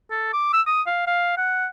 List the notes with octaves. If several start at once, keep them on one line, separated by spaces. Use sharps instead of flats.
A4
D6
E6
D#6
F5
F5
F#5